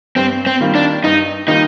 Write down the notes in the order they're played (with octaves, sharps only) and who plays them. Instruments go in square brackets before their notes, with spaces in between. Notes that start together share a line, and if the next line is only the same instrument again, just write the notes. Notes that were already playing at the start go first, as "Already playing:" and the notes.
[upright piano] G2 [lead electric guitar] C4
[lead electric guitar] C4
[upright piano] D#3 G3 A#3 F4
[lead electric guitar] D4
[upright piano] G2 [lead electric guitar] D#4
[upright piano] D#3 G3 A#3 F4 [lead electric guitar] D#4